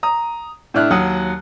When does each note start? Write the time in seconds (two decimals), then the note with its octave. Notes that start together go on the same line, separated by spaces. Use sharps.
0.03 A#5 D#6
0.74 A2 D4 E4 F6 F#6
0.90 D#2 F#3 F#5 D#6